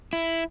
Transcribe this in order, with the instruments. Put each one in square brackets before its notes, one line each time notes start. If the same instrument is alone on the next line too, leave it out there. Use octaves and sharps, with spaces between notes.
[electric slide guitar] E4